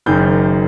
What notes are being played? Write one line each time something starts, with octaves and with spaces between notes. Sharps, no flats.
F#1 F#2 D#3 G6